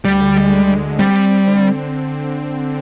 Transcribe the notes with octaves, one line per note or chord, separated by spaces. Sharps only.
D2 G3
D3
G#3
G#3
D2
D2
G3 C4
C4
C4
D3